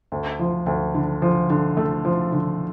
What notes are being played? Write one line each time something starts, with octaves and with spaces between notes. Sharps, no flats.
D2
F3
D2
D3
F3
D3
A3
F3
D3